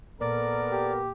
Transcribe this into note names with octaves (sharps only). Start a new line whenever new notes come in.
A#2 A#3 B3 A4 A#4 D5
G4